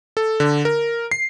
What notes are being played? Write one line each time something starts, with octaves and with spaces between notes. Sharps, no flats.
A4
D3
A#4
C7